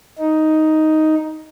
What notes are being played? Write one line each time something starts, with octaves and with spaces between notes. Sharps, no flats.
D#4